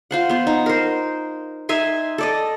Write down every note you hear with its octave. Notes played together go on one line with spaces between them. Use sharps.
F4 C5 F#5
B3 C5
D#4
A#4 C5
D#4 E5 G#5 C6
A4 D5 D#5